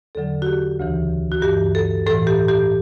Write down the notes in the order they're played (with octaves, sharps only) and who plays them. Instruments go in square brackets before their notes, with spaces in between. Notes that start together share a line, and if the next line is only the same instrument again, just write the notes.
[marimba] E2 D3 F#3 A4
F#4
G4
D2 C#3 E3
F#4
G2 G4
E3
A4
A2 E3 A4
G4
G4